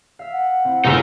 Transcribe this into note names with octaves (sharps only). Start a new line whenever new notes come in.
E5 F5
F#5
C4 E4
G1 A#2 C#3 G3 A3 D#4 E4 A#4